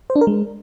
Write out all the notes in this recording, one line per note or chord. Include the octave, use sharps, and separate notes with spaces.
C5
D4
A#4
G#3